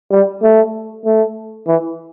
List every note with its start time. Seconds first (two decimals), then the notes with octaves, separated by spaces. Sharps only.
0.11 G3
0.42 A3
1.05 A3
1.67 E3